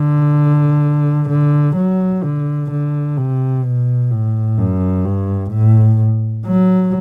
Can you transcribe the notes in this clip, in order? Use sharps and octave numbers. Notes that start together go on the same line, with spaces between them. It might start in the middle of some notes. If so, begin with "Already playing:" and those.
Already playing: D3
D3
F#3
D3
D3
C3
B2
A2
F#2
G2
A2
F#3